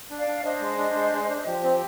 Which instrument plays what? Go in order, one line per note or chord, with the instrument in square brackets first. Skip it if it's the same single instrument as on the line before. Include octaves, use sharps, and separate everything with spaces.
[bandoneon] D4
[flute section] D5 F5
[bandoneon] D4
[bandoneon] D4 [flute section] C5 D#5
[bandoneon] G#3
D4
G#3
G#3
D4
[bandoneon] F3 [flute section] G4
[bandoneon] C4
[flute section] G4